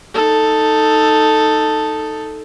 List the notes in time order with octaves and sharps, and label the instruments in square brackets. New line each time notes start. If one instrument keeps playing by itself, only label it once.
[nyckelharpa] D#4 A4